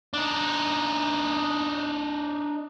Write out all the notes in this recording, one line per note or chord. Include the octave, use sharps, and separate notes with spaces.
D4 D#4